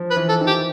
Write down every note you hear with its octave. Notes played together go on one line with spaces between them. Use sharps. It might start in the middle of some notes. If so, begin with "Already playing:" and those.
Already playing: F3
B4
E3
A4
D#3
G4